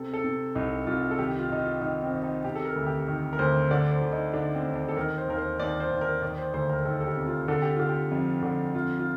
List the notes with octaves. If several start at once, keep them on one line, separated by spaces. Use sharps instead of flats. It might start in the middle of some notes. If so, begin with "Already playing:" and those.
Already playing: C3 A4
A4
C3
C2 D#4
C2 F4
A4
D#3 G4
F4
D#3 D#4
F4
D#3 D#4
C4
D#3
D#4
C3 G4
A4
A#4
D2
G4
D#3
A#4
D2 C5
D3 D5
C5
D3
D#4
D3 D4
C4
D#2
D4
A4
D#3 A#4
C5
D#2 A#4
C5
D#2 D5
C5
D#2
A#4
D#3 D5
C5
D2 C5
A#4
D#3 A4
A4
G4
C3
F4
D3 A4
G4
D3 F4
G4
F2
D3
F2 F4
F4